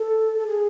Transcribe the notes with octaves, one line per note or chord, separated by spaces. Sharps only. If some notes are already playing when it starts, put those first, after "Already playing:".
Already playing: A4
A4
G#4